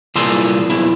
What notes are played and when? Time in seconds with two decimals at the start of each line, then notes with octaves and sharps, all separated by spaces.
0.15 C2 A#2 E3 G#4 A4 C6
0.69 B1 E2 E4